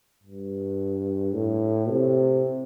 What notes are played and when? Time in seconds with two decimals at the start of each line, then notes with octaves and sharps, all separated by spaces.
0.24 G2
1.34 A2
1.90 C3